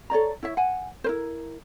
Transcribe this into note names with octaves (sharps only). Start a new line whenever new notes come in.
A4 C#5 D5 A#5
E4 C#5 E5
F#5 G#5
E4 A#4 C5